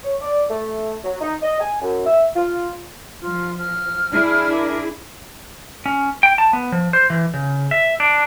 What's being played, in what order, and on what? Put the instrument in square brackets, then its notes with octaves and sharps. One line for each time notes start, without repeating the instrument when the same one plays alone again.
[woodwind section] C#5
D5
A3
F#3
D#4
D#5
G#5
F#2
E5
F4
[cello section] F3 [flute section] F4 F6
[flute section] F6
[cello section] D4 E4 G#4
[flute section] A#4 D6
[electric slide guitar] C#4
G5
A5
B3
F3
C5
E3
C#3
E5
D4